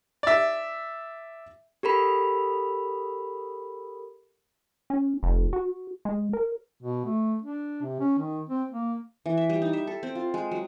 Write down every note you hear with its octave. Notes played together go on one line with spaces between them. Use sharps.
D5 E5
G4 A4 A#4 B5
C#4
F1
F#4
G#3
A#4
B2
A3
D4
C3
C#4
D#3
C4
A#3
E3
E5
G3
D#4
E5
A4
C4
F4
G#3
F#3